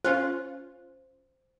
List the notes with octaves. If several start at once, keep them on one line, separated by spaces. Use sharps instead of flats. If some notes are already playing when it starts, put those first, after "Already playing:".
C#4 F4 C5